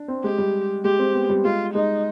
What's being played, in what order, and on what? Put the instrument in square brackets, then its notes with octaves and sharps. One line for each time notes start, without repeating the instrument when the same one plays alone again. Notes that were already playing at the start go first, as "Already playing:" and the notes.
Already playing: [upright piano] D4
C4
[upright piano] G#3 [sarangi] G4
[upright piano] G3
[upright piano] G#3 [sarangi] G4
[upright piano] C4
B3
G3
[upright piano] G#3 [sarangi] F4
[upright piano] G#3 [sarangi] D#4